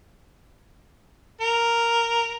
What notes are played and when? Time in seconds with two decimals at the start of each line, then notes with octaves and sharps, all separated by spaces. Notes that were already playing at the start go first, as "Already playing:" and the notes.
1.41 A#4